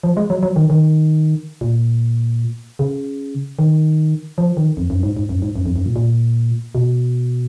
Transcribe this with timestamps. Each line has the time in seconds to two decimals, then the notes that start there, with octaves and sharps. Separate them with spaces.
0.04 F3
0.17 G#3
0.30 F#3
0.43 F#3
0.56 D#3
0.70 D#3
1.61 A#2
2.79 C#3
3.59 D#3
4.38 F3
4.57 D#3
4.77 F2
4.90 F#2
5.03 G#2
5.17 G#2
5.29 F#2
5.42 G#2
5.56 F#2
5.66 F2
5.76 F#2
5.85 A#2
5.96 A#2
6.75 B2